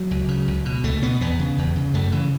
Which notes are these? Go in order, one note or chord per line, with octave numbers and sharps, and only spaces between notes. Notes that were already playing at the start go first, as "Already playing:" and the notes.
Already playing: F#3
C#2
C#3
C#2
B2
C#2 A3
B2 B3
E2 B3
C#3
E2
C#3
F#2 A3
C#3 E3